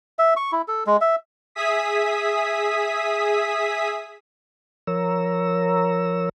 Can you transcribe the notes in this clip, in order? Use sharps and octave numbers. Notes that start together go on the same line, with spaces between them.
E5
C#6
E4
A4
G#3
E5
G#4 E5 D#6 B6
F3 A#4 C#5 A#5 E6